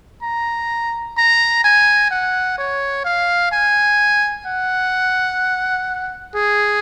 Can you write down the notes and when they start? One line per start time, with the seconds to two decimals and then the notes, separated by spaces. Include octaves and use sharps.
0.23 A#5
1.18 A#5
1.64 G#5
2.11 F#5
2.58 C#5
3.05 F5
3.52 G#5
4.46 F#5
6.35 G#4